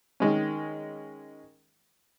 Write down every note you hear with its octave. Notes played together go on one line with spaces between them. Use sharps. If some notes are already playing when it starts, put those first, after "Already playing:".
D#3 G#3 C#4